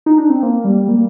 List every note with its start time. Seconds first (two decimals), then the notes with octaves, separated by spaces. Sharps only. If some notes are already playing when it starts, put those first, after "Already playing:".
0.06 D#4
0.18 D4
0.30 C4
0.43 A#3
0.64 G3
0.88 A#3